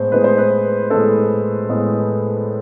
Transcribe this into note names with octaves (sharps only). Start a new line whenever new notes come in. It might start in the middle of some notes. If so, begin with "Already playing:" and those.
Already playing: A2 G#3 B3 C5
A2 G#3 B3 B4
C5
B4
A2 G#3 B3 A4
A2 G#3 B3